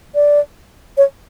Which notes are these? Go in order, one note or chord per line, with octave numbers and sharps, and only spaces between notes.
D5
C#5